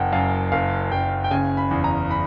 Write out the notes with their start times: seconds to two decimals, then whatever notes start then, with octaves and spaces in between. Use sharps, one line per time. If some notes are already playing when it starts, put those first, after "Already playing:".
Already playing: F#1 F#5 G5
0.12 F#2 F5
0.52 F#1 F5
0.92 F#1 G5
1.24 G5
1.31 C#3 G#5
1.57 B5
1.71 E2
1.84 A#5
2.11 B5